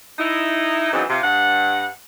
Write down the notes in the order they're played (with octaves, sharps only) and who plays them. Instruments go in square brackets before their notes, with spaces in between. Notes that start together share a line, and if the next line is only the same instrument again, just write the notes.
[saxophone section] D#4 E4
C#3 E3 F#3 B3 C4 D#4
C3 F4
G2 F#5